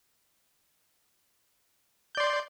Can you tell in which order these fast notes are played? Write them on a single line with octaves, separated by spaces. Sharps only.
G6 D5 C6